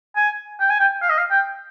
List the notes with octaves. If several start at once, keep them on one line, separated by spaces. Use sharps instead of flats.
G#5
G5
G#5
G5
F5
D#5
F5
G5